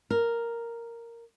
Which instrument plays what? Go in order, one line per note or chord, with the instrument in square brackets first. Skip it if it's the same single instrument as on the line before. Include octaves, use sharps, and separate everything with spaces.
[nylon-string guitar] A#4